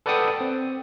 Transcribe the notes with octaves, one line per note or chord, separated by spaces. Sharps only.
A4 B4 D5 F#5 G5 D#6
C4